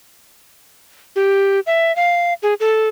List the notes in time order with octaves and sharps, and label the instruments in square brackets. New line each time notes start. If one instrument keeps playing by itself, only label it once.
[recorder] G4
E5
F5
G#4
A4